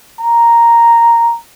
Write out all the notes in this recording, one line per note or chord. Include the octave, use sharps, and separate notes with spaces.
A#5